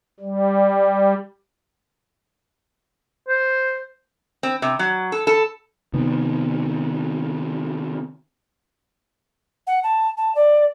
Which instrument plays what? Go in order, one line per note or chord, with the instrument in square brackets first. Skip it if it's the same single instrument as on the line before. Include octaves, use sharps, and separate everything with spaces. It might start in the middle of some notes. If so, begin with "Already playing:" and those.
[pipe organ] G3
[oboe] C5
[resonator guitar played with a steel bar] C4
C3
F#3
A4
A4
[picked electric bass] C3 D#3 B3
[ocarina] F#5
A5
A5
D5